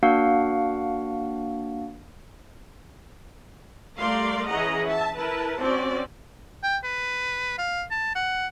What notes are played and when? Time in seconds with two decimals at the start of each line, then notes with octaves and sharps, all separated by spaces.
0.03 A#3 D4 F#4 F5 F#5
3.98 G3 A3 A#4 D5 F5 C6
4.48 E3 C#4 G#4 D#5 F#5 A#5
4.87 E5 A5
5.17 E4 A#4 B4 A5
5.61 C4 C#4 F#4 D5
6.63 G5
6.84 B4
7.58 F5
7.91 A5
8.15 F#5